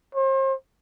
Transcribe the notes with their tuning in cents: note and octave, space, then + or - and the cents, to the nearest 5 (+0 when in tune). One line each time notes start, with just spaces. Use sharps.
C5 +40